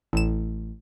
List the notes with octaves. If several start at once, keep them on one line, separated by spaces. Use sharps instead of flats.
A1 E7